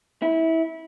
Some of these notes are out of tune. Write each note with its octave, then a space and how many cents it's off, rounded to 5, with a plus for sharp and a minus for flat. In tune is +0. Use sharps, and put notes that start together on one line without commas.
E4 -20